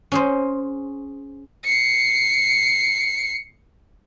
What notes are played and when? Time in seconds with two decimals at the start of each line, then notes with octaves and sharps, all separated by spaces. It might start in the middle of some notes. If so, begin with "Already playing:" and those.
0.12 C#4 G#4 C5
1.65 C7 C#7